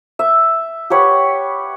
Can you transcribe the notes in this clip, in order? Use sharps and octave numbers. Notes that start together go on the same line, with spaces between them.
E5
G4 B4 C#5 F#5